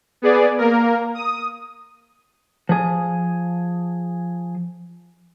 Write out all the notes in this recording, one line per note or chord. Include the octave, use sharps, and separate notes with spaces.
B3 G#4 D5
A#3 A#4
D#6
F3 G#4